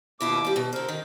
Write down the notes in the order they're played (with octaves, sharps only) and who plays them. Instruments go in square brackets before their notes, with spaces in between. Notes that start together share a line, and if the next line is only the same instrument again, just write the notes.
[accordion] D#2 D6 [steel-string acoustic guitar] B2 E4 F4
[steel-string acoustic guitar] G3 G4
B2
[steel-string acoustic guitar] D3 C5 [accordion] A#4
[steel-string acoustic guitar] D#3